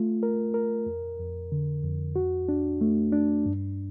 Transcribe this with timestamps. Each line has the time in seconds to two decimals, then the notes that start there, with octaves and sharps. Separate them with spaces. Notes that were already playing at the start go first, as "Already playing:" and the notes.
Already playing: A3 F4
0.23 A#4
0.54 A#4
0.86 F2
1.20 F2
1.52 D3
1.84 F2
2.16 F#4
2.49 D4
2.81 A3
3.12 D4
3.46 G2